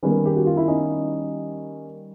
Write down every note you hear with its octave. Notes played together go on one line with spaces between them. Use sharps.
D#3 G3 A#3 B3 C#4
G4
F#4
F4
E4
C#4 D#4